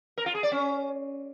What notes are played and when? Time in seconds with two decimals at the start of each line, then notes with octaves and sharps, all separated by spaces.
0.18 A#4
0.26 F4
0.35 G#4
0.43 D5
0.52 C#4